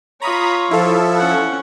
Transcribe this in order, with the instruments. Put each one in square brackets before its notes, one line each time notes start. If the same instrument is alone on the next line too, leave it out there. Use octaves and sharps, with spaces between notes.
[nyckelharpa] F4 C#5 [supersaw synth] A#5 B5 D#6
[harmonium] F3 [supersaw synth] E4 A4 [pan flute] F5
[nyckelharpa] C#4 F#5